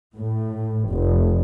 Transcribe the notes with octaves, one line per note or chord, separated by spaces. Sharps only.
A2
F1